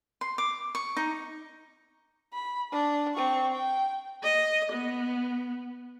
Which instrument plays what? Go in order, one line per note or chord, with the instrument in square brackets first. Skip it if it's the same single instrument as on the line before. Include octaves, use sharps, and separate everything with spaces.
[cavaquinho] C6
D6
C#6
D#4
[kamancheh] B5
D4
C4 C#6
G5
[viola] D#5
B3